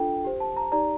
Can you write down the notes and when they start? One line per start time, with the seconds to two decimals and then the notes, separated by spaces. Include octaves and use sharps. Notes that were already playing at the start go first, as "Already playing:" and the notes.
Already playing: D4 F4 A4 G5
0.24 G4 C5
0.40 A5
0.57 A#5
0.72 D#4 G4 D5 A#5